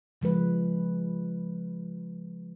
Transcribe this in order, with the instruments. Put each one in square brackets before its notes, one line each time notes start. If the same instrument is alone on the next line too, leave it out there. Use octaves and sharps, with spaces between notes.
[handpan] C#3 F3 G#3 B4